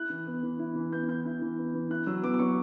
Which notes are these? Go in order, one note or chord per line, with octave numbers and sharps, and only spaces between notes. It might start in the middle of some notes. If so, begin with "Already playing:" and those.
Already playing: E4 F#6
E3
B3
E3
E4
E3
B3 G6
E3 G6
E4
E3
B3
E3
E4 F#6
F#3 E6
B3 D6
D6
F#3 C#6